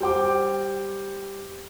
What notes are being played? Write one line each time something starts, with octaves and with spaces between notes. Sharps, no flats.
G3 C5 G5 D6